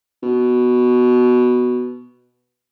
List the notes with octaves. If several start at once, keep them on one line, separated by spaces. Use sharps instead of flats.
B2